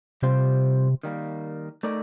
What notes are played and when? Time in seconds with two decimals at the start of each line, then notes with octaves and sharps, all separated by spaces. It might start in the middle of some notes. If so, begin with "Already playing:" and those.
0.22 C3 G3 C4 F4 C5
1.03 D#3 G3 A#3
1.83 A3 D#4 A#4 D5